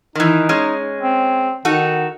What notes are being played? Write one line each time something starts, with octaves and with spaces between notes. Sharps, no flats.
D#3 E3 D#4
G#3 C#4
C4
D#3 D#4 F#4 A4